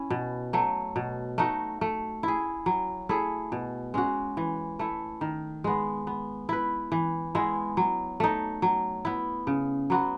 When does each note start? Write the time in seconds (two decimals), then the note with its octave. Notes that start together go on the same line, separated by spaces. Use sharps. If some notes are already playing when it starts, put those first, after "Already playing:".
Already playing: C#4 E4
0.10 B2
0.53 F#3 A3
0.96 B2
1.38 A3 D#4 F#4
1.81 A3
2.23 E4 G#4
2.66 F#3
3.09 A3 E4 G#4
3.52 B2
3.94 G#3 C#4 F#4
4.37 E3
4.79 A3 E4
5.21 D#3
5.64 G#3 B3
6.07 B3
6.49 E4 B4
6.92 E3
7.35 G#3 B3 E4
7.77 F#3
8.20 A3 D#4
8.62 F#3
9.05 B3 E4
9.47 C#3
9.90 F#3 B3 F#4